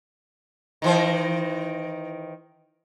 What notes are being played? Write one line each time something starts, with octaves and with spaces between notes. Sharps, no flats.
D#3 E3 C5